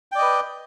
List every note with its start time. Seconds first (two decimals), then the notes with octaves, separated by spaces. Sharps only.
0.12 G5
0.15 D5
0.18 D#5
0.22 B4